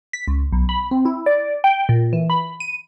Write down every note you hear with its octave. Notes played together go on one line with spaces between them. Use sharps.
B6
C#2
B1
B5
C4
E4
D5
G5
A#2
E3
B5
D#7